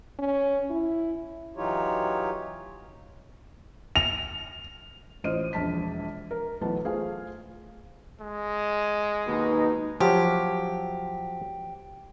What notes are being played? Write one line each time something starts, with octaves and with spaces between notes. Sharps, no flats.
C#4
E4
E3 F#3 D#4 F4 G4 C#5
F7
A1 F4 C5 D#5 F6 D#7
E1 A#1 A5 B6
A#4
B1 E3 A3 B3 A5
A3 F4 G#4 C5 F5
G#3
D#2 B2 D#4
F3 F#3 G4